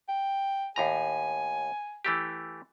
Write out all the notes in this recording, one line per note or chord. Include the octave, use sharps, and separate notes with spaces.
G5
D#2 A2 G#5 A#5
E3 A3 G4